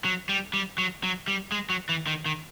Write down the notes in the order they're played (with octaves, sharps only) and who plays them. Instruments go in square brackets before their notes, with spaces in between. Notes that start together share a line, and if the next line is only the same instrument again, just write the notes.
[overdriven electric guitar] F#3
G3
G3
F#3
F#3
G3
G#3
F#3
E3
D#3
D#3